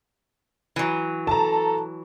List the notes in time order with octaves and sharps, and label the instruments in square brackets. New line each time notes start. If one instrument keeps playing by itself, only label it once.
[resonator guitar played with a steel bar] E3 F#3
[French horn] A4 [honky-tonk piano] A5 A#5